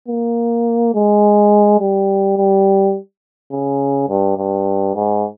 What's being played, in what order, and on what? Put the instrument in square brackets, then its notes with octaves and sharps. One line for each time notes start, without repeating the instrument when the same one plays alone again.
[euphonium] A#3
G#3
G3
G3
C#3
G2
G2
G#2